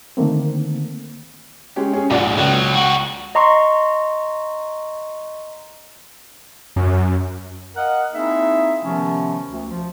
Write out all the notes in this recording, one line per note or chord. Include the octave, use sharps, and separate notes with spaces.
D3 D#3 A3 A#3 C4
G#3 C#4 G4
C#4 G#4
A#1 D#2 G#2 D5 F#5
C#2 B2 F#3
G3 F#4
D#5 A#5 C6 C#6
F#2
A#4 D#5 F5 F#5
A#3 C4 D#4 E4 G#4 E5
C3 D#3 F3 A3 B3 C#4
D2
F3